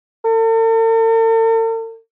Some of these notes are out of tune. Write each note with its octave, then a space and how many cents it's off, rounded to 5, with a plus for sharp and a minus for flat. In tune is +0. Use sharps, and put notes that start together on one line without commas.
A4 +45